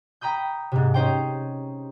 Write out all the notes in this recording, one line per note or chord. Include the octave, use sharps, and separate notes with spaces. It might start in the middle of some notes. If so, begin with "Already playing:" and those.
G5 A#5 B5 D#6 G6
G#2 C3
C#4 D#4 C5 G5